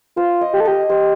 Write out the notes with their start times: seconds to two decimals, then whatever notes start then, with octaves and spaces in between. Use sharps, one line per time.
0.16 F4 C5
0.41 D#5
0.53 G4
0.60 A4
0.65 G4 D#5
0.89 G4 C5